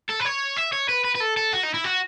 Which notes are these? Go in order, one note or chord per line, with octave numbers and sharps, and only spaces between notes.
A4
B4
C#5
E5
C#5
B4
B4
B4
A4
A4
F#4
D#4
E4
F#4